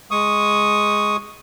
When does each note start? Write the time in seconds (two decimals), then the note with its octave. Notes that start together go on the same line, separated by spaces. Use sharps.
0.11 G#3 C#6 D#6